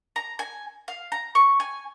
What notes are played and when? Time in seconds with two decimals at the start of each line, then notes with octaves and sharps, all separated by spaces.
0.16 A#5
0.39 G#5
0.88 F5
1.12 A#5
1.35 C#6
1.60 G#5